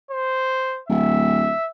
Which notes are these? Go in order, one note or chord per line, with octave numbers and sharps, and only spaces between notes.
C5
D1 E5